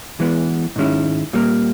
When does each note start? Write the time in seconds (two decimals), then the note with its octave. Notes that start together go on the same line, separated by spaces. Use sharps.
0.20 E3 G#3 B3
0.76 G#2 D#3 G#3 C#4 E4
1.33 A#2 G3 A#3